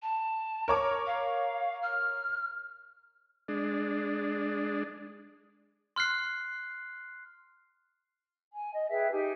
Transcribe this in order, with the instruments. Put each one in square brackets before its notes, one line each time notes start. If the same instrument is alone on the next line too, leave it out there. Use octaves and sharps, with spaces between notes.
[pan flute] A5
[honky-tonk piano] A#4 C#5 D6
[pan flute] F5
F6
[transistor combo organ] G#3 D4
[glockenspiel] C6 F6 F#6 C7
[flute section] G#5
D#5
G#4 B4 E5 G5
D#4 G4 G#5